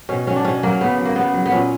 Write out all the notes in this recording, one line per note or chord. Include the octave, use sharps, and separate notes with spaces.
B2 C#4
F#3 C#4
D4
B2 C#4
F#3 A#3
C#3 B3
F#3
A#3
C#3 B3
F#3
B3
A#2 C#4